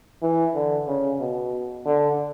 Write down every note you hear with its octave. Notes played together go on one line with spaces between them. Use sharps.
E3
D3
C#3
B2
D3